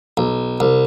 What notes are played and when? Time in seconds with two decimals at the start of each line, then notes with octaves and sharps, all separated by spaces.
0.17 B1
0.60 C2